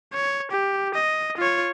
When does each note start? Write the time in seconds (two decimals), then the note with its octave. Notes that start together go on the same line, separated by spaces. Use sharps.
0.14 C#5
0.52 G4
0.94 D#5
1.38 F4 C#5